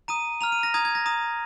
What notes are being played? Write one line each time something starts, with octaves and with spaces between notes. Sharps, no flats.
A#5 D#6 D#7
A#5 F6 F7
D#7
A#6
A#5 D#6 G#6
G#6
A#6
A#5 D#6